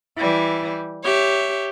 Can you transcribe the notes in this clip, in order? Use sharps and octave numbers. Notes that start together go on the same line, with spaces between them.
E3 G3
G4 C#5 E5